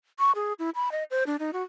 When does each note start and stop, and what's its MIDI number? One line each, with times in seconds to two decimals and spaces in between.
0.19 0.32 85
0.35 0.53 68
0.59 0.70 64
0.75 0.91 83
0.92 1.03 75
1.11 1.24 72
1.27 1.36 62
1.39 1.51 63
1.53 1.63 66